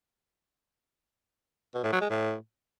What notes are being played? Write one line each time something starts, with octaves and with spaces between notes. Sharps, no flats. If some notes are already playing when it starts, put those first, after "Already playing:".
B2
A2
F#3
G#3
A2